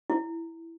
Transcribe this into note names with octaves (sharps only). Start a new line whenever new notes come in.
E4